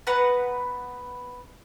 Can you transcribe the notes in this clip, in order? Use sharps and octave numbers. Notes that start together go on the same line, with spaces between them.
B3 B4 F#5 A#5